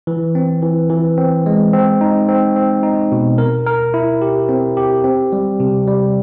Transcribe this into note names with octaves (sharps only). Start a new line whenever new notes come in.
E3
C4
E3
E3
C4
G#3
C4
D#4
C4
C4
D#4
B2
A#4
A#4
E4
G4
C4
G4
C4
G3
C3
G3